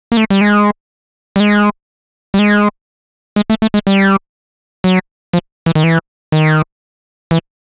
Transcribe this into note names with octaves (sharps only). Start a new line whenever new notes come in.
A#3
A3
G3
G#3
G3
G#3
G3
G#3
G#3
A3
A3
G#3
G3
F#3
F3
E3
D#3
E3
D#3
E3